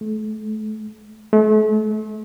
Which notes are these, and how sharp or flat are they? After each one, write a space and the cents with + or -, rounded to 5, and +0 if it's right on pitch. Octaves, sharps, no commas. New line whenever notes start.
A3 -35
A3 -40